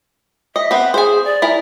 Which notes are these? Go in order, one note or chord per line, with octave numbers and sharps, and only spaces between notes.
D#5 E5
B3 C4
G#4 C5 G#5
D5
E4 A#4 G#5